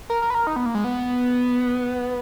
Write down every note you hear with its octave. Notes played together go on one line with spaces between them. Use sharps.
A#4
A#4
B4
A#4
D#4
B3
A#3
G#3
B3